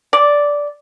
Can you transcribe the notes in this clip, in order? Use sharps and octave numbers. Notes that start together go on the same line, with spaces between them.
D5